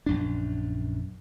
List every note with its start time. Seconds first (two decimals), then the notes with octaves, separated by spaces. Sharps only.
0.06 A#1 F#2 D4